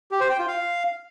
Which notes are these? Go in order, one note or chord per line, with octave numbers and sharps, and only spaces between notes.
G4
C5
G5
F4
F5